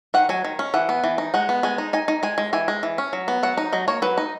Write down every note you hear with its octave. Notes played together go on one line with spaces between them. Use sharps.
D#3 F#5
F#3 G#5
D#3
C#4
E3 F#5
B3
E3
D#4
G#3 F#5
B3
G#3 G#5
D#4
D#4 G#5
D#4
G#3 G#5
G#3
E3 G#5
G#3
E3
C#4
F#3
B3
F#3 F#5
D#4
F#3 D#5
A#3 C#5
F#3 B4
D#4